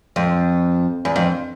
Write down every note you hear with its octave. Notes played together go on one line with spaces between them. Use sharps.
F2
E2
F2